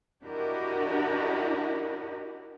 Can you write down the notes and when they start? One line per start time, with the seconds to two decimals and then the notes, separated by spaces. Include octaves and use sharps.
0.22 D4 E4 F#4 G4 A#4 D#5